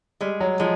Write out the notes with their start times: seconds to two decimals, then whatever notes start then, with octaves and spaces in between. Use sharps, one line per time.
0.21 G3 G#3
0.40 F#3
0.60 F3 G#3